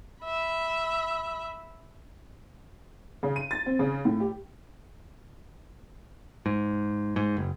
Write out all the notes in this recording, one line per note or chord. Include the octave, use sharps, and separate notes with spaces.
E5 B5
C#3
D#7
A6
C4
C#3
A2
G4
G#2
G#2
F#1